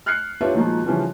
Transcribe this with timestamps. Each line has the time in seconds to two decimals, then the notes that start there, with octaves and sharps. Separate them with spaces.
0.06 F6 F#6 G#6 C7 C#7
0.41 D4 F4 G4 B4 C#5 E5
0.54 A#2 D#3 F3 F#3 G#3 A#3
0.84 C#3 E3 F3 G3 C#4 D4